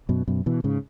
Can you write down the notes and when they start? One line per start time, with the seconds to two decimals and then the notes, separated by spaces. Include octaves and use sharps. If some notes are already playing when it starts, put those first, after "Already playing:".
0.09 F#2 B2
0.28 F#2 B2
0.46 B2 E3
0.64 G#2 C#3